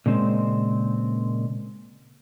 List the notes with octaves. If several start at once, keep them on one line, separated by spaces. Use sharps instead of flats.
A#2 C#3 G#3 C4